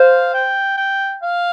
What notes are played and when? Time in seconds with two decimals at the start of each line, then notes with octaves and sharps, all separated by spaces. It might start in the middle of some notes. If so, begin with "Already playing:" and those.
Already playing: C5 F5
0.34 G5
0.77 G5
1.22 F5